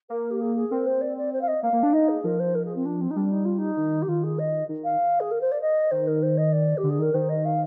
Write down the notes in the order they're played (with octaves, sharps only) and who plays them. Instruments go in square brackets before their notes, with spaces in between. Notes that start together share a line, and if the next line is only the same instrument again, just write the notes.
[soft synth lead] A#3 [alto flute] A#4
[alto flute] G4
G#4
G#4
[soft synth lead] C4 [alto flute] A#4
[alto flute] C5
D5
D5
C5
F5
D#5
[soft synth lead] A#3 [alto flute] F5
[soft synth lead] A#3
D4
[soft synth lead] D#4 [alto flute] D#5
[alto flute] G#4
[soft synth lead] F3 [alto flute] A#4
[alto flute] C5
A#4
G#4
C4
D4
C4
D#4
[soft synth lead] G3 [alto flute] D4
[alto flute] D#4
F4
D#4
[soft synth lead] D#3
[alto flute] G4
[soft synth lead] D#3 [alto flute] F4
[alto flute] G#4
D#5
[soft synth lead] D#3
[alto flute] F5
G#4
A#4
C5
D5
D#5
[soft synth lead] D#3 [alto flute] C5
[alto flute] A#4
C5
D#5
D5
G4
[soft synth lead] D3
[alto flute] G#4
[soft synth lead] D#3 [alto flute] A#4
[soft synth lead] D#3 [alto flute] C5
[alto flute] D#5
F5